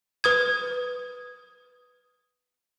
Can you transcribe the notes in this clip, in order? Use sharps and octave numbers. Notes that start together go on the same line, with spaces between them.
B4 D#6 G#6